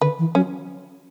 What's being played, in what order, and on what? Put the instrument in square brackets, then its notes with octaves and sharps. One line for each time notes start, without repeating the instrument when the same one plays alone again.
[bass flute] D3 [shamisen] B4
[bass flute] E3
[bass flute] F#3 [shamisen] C#4